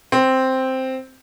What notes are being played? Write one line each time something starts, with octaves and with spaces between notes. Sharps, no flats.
C4